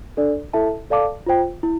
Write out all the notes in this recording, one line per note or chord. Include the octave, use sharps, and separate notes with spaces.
D4 A4 D5
E4 A4 E5 A5
A4 D5 F5 A5 D6
F4 C5 G5
E4